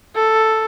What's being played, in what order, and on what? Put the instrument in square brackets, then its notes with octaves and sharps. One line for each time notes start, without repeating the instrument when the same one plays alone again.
[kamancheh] A4